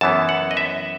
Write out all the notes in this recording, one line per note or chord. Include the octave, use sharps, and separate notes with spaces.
F#2 E3 B3 A5
F#5
D#5
E5